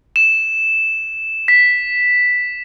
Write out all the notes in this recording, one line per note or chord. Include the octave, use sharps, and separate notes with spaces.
E7
B6